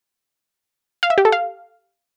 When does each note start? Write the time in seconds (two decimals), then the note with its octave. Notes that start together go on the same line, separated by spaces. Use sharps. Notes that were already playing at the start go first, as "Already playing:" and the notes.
1.03 F5
1.10 E5
1.18 G4
1.25 A4
1.32 F5